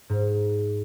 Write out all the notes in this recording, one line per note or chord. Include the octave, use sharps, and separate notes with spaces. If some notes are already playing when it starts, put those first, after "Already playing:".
G#2